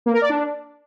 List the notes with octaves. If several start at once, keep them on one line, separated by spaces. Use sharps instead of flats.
A#3
A#4
D5
D4